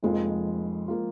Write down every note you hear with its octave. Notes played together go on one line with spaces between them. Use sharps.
F1 F2 F3 G#3 A#3 F4
F3 A#3 F4